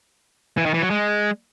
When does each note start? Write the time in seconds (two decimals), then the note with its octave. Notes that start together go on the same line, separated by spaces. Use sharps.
0.58 E3
0.66 D#3
0.74 E3
0.82 F#3
0.90 G#3